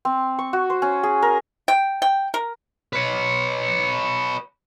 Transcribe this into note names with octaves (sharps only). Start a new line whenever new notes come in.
C4
C#6
F#4
C5
C#4
G#4
A#4
G5
G5
A#4
B4 C#5